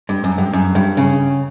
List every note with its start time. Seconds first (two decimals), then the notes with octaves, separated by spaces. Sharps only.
0.09 G2
0.24 F#2
0.38 G2
0.53 F#2
0.75 G2
0.97 C#3